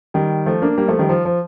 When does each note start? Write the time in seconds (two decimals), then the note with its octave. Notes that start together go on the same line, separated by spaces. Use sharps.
0.14 D#3 G3
0.46 F3 A3
0.62 A#3 D4
0.78 G3 A#3
0.88 F3 A3
0.99 D#3 G3
1.09 F3
1.25 F3